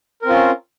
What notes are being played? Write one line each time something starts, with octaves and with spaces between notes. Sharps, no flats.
C4 C#4 F4 A#4